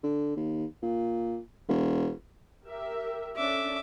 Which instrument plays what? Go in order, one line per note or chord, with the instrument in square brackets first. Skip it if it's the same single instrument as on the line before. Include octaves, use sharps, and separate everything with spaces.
[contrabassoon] D3
D#2
A#2
E1
[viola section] G4 A#4 E5
[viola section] C#4 D4 A4 [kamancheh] E5 D6